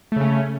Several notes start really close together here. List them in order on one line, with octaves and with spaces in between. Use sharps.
A3 C#3 C#4